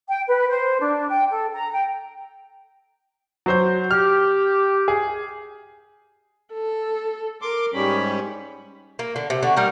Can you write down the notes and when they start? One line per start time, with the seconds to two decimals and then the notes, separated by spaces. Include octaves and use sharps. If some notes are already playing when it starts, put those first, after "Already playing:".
0.08 G5
0.27 B4
0.49 C5
0.80 D4
1.09 G5
1.31 A4
1.54 A#5
1.72 G5
3.46 F#3 C5 G6
3.91 G4 F6
4.88 G#4
6.53 A4
7.42 A#4 C6 D6
7.74 G#2 G3 C#4 G4 B5
8.99 A#3
9.16 D3
9.30 C3
9.43 D3 F#4
9.56 G3 A#3 D#4 A#4